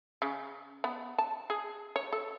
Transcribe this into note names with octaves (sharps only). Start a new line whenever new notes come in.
C#3
B3
A5
G#4
C#5
A4